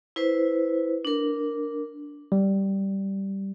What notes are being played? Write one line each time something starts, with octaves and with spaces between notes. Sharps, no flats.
E4 B4 C5
D4 A#4
G3